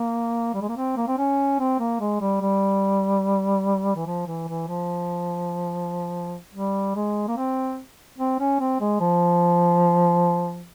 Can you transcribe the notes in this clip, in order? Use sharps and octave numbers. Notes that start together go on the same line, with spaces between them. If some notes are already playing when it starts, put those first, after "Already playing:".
Already playing: A#3
G3
G#3
A#3
C4
A#3
C4
C#4
C4
A#3
G#3
G3
G3
E3
F3
E3
E3
F3
G3
G#3
A#3
C4
C4
C#4
C4
G#3
F3